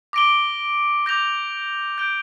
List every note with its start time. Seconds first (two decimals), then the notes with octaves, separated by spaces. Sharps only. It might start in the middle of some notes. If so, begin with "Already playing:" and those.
0.13 D6 A#6 D7 G7
1.06 D6 G6 A#6 F7
1.98 G6 D7 G7